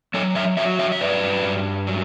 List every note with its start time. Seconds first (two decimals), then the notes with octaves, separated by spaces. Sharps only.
0.14 F#3 A4 C#5
0.35 C#5 E5
0.57 F#3 C#5 E5
0.79 C#5 E5
0.92 E5
1.01 G2 B4 D5
1.44 G2
1.87 F#3